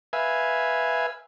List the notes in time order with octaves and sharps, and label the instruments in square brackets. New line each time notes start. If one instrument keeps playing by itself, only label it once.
[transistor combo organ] B4 E5 F5 G#5